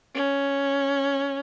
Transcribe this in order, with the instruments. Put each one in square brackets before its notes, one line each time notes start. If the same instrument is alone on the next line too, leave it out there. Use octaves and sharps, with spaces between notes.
[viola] C#4